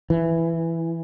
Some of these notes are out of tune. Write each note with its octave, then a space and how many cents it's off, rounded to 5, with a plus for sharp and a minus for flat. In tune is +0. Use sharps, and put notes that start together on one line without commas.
E3 +5